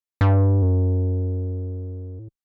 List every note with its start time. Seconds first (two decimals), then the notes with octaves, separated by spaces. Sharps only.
0.21 G2
0.62 F#2
2.19 A2